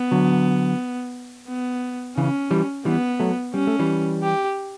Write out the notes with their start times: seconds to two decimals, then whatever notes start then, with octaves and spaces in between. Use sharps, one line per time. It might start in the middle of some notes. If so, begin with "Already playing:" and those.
Already playing: B3
0.11 D3 F#3
1.48 B3
2.17 C#3 E3 C#4
2.51 E3 G3
2.85 E3 G3 B3
3.20 F#3 A3
3.54 G3 C#4
3.67 A3
3.79 E3 G3
4.23 G4